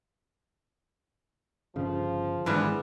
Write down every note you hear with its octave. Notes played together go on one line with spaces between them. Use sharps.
G1 C#3 F3
G#1 D3 E3 G3 G#3 B3